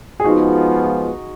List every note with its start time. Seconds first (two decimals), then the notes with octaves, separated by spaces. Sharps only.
0.20 G#4
0.24 F3 G#3 B3 D#4 F4 F#4